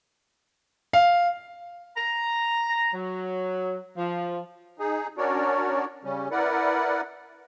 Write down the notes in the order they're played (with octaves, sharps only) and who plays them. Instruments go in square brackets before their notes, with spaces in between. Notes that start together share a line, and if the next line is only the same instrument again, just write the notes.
[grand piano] F5
[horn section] A#5
F#3
F3
[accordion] D#4 G#4
C#4 D4 F#4 A#4 C#5 D5
C#3 G3 C#4
E4 A#4 B4 D5 F#5